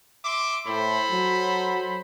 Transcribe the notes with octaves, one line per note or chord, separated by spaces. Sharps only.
E5 C6 D6
A2 A4 C5 B5
F#3